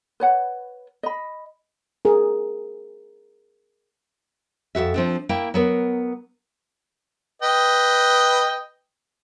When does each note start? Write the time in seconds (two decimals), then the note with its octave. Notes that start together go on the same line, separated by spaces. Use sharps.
0.20 B4 C#5 F#5
1.03 D#5 B5
2.05 G#4 A#4
4.75 F2 G#2 F#4 E5
4.94 F3 C4 D4
5.29 A#3 E4 G5
5.54 F#3 B3 A#4
7.42 B4 D#5 G5